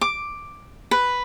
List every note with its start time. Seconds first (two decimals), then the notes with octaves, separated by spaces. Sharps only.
0.01 D6
0.91 B4